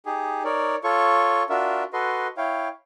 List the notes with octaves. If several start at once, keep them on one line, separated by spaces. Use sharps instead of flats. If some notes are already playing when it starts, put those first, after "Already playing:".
D#4 G4 G#4
D#4 A#4 C#5 D5
F4 A4 C#5 C#6
D4 F4 F#4 A#4 E5
F#4 A4 B4 D#5 C6
E4 C#5 F5 G5